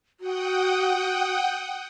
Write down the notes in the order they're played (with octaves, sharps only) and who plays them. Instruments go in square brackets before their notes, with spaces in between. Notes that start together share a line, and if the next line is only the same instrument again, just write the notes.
[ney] F#4 [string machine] F#5 G5 D#6